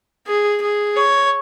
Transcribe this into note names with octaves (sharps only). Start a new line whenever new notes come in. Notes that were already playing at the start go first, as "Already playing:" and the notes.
G#4
G#4
C#5